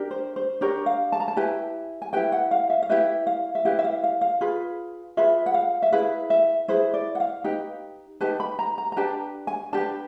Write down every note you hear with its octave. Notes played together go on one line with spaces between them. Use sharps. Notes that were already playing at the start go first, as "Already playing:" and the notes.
Already playing: D4 G4 A#4
C5
C5
D4 G4 A#4 C#5
F5
A5
A#5
A5
E4 G4 B4 G#5
G#5
E4 G4 B4 G5
F#5
F5
E5
F5
E4 G4 B4 E5
F5
E5
E4 G4 B4 F5
E5
F5
F5
F5
F4 G#4 B4
F4 G#4 B4 E5
F#5
F5
E5
E4 G#4 B4 F5
E5
E4 G#4 B4 C5
D5
F#5
F5
D#4 G4 B4 G5
D#4 G4 B4 A5
B5
A#5
A#5
A#5
D4 G4 B4 A5
G#5
D4 G4 B4 A5